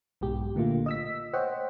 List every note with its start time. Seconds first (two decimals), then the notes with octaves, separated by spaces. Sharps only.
0.21 B1 G#2 B2 G4
0.55 A#2 D3 A3 A#3 F4
0.86 D#5 E6 B6
1.33 C5 C#5 D#5 F#5 G5